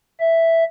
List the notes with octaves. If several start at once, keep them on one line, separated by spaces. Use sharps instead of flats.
E5